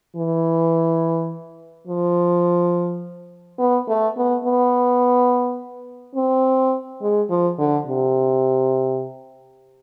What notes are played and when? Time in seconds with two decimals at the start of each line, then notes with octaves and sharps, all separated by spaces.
0.16 E3
1.87 F3
3.59 B3
3.88 A3
4.17 B3
4.45 B3
6.16 C4
7.02 G#3
7.30 F3
7.59 D3
7.87 C3